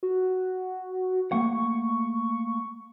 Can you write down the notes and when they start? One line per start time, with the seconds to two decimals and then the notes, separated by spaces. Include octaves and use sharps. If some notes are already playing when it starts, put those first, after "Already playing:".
0.03 F#4
1.32 A3 A#3 F#5 C#6